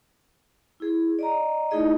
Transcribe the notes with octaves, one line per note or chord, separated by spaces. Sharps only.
E4 G#4
D5 D#5 A#5
A3 D#4 E4 G#4 D#5